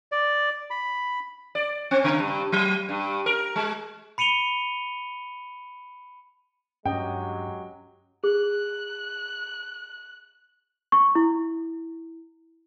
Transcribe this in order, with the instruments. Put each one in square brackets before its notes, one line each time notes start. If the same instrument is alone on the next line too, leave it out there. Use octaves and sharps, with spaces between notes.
[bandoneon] D5
B5
[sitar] D5
C4
C#3
G2
F#3
G2
A#4
G#3
[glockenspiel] B5 C#7 D#7 F7 G7
[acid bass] G2 [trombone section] F#3 G#3 G4 [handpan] C#4 D#5 [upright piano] G5
[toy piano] G#4 [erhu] F#6
[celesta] C#6
E4